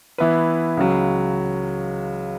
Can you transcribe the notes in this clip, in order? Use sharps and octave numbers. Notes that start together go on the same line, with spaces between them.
E3 B3 E4 B4
C#2 C#3 F#3